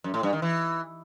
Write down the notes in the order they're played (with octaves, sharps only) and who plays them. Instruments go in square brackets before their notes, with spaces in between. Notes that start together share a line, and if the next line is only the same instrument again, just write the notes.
[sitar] F#2
A2
G2
D#3
E3